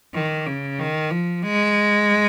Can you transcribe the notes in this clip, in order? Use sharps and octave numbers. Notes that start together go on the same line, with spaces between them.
D#3
C#3
D#3
F3
G#3